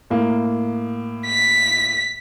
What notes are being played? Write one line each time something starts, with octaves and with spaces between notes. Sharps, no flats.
A2 A#3
B6